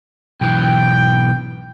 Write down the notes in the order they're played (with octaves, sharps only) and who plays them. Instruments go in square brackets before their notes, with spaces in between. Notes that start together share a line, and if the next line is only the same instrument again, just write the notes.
[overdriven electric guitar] B1 E3 [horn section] G5